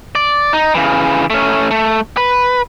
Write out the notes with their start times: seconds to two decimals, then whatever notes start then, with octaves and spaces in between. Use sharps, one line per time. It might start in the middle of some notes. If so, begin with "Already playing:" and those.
0.15 D5
0.53 D#4
0.75 C#3 E3
1.30 A3 C#4
1.71 A3
2.17 B4